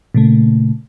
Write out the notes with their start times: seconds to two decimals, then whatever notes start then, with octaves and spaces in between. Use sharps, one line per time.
0.15 A#2 C#3 A3